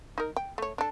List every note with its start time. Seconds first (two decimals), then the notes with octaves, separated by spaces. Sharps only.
0.18 D#4 A#4
0.36 G5
0.58 A3 C#5
0.78 D4 A4